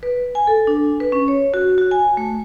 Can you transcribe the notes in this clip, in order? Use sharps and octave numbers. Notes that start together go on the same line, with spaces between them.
B4
G#5
A4
D4
B4
C#4
C#5
F#4
F#4
G#5
A3